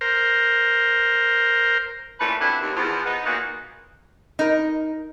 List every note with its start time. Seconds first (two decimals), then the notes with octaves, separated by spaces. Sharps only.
0.01 A#4 C5
2.20 A#2 E3 A3 C#4 B4
2.40 F2 B2 B3 D4 E4
2.60 D#2
2.76 E2 F3
3.05 B3 D#4
3.25 A#2 A#3 B3 D#4 F#4 G#4
4.39 D#4 A#4